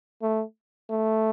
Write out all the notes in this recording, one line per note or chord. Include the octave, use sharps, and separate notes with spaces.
A3
A3